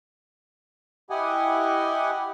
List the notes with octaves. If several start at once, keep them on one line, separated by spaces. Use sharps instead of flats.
E4 G4 D#5 F#5 G#5